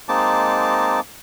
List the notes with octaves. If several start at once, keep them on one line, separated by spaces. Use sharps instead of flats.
G#3 A#3 C4 D#4 A5 D6